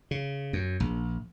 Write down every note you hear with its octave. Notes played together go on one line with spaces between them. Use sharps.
C#3
F#2
A#1